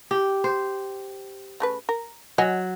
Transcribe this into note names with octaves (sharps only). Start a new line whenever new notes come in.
G4
C5
C#3 A3 B4
A#4
F#3 D#5 F#5 G#5